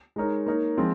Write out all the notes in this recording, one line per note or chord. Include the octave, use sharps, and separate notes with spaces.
G#3 D#4 A#4 C#5
A#3 D#4 A#4 C#5
F3 G#3 C4 F4